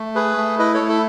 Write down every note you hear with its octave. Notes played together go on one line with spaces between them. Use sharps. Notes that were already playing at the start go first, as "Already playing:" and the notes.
Already playing: A3
G#4 B4
A3
E4 B4 D#5
A4 C#5
A3
A4